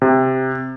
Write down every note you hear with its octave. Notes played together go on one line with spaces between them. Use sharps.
C3